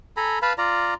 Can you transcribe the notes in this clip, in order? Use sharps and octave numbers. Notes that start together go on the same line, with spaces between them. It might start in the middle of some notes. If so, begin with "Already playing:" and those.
A4 G#5 A#5 B5
B4 F5 A5 B5
F4 D5 A#5